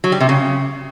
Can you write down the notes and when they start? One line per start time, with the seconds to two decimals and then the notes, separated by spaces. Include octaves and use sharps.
0.04 F#3
0.12 G3
0.20 C3
0.29 C#3